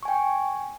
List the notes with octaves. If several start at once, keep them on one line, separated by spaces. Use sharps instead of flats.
G5 G#5 C#6